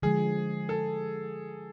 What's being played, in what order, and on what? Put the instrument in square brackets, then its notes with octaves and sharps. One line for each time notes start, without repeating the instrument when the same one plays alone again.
[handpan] D3 F3 G#3 [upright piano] G#4
[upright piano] A4